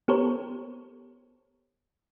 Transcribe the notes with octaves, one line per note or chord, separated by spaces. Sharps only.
B3 G4 A4 A#4 C5 C#5